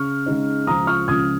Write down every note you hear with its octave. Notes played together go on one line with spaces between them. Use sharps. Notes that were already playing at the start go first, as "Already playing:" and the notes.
Already playing: C#3 C#6 F6
C#3 G#3 D#4
C#2 C#3 F3 A#5 D#6
C#6 F6
C#2 C#3 F3 D#6 G#6